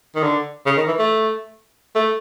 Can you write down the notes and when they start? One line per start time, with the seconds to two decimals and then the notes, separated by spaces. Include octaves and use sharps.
0.15 D#3
0.23 D3
0.66 C#3
0.77 D#3
0.87 E3
0.98 A3
1.95 A3